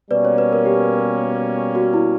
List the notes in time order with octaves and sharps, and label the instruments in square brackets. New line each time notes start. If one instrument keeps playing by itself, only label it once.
[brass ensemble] B2 G3 A#3 C#4 [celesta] B4 D5
[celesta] C#5
B4
A#4
G4
F#4
E4